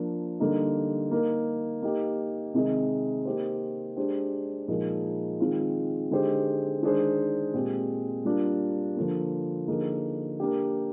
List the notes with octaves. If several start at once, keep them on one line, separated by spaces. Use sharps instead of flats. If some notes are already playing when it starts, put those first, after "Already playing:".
Already playing: F3 A#3 D4
D3 G3 A#3 D#4
A#3 D#4 A#4
A#3 D#4 G4
C3 D#3 G#3 C4 D#4
A#3 D#4 G4 C5
G#3 D4 G4 C5
A#2 F3 G#3 D#4 A#4
D#3 G#3 C4 F4
D3 G#3 D#4 G4 C5
D#3 G#3 D4 G#4 C5
A#2 G#3 C4 G4
G3 A#3 D4 F4
D3 F3 A#3
D3 F3 A#3 D#4 G#4
A#3 D4 G4